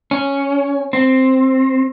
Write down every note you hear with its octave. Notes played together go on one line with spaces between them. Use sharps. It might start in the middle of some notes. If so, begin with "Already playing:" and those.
C#4
C4